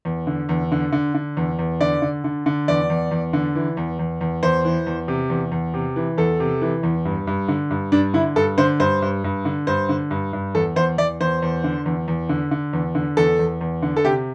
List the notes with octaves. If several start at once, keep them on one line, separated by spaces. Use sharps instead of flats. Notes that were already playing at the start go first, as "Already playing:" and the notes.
E2
D3
E2
D3
D3
D3
E2
E2
D3 D5
D3
D3
D3
E2 D5
E2
E2
D3
E3
E2
E2
E2
E2 C5
E3
E2
C3
E2
E2
C3
E3
E2 A4
C3
E3
E2
G2
G2
D3
G2
G2 D4
D3 E4
G2 A4
D3 C5
G2 C5
G2
G2
D3
G2 C5
D3
G2
G2
E2 A4
E2 C5
E2 D5
E2 C5
E2
D3
E2
E2
D3
D3
E2
D3
E2 A4
E2
E2
D3
A4
C3 G4